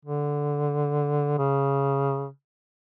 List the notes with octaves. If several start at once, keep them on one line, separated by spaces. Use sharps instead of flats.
D3
C#3